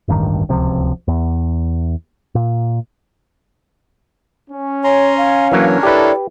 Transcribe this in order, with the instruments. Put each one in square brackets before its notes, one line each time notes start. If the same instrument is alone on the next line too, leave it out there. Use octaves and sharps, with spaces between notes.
[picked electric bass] E1 A1 G2 D#3
D1 C#2 C3 F3
E2
A#2
[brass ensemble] C#4
[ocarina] C#5 [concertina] G#5 A#5 C6
[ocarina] F5
[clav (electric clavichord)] E3 F#3 A#3 [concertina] D4 A#4 C#5
[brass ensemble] E4 A4 [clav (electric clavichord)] G4 B4 [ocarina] D5